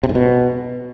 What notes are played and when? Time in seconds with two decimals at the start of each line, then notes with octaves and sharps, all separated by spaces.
0.03 C3
0.09 G#2
0.15 B2